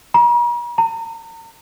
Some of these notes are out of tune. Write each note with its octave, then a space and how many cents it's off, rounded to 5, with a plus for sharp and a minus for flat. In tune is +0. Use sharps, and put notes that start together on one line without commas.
A#5 +45
A#5 -40